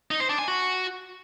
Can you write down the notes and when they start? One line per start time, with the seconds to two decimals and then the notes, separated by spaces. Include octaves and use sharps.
0.11 D#4
0.20 C5
0.29 D4
0.39 G#5
0.48 F#4